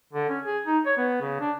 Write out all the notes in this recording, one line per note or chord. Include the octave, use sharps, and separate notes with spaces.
D3
C#4
G#4
D#4
C#5
B3
C#3
D4